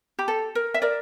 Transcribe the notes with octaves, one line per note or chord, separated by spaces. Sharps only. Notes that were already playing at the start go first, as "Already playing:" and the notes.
G4
A4
A#4
E5
A#4 D5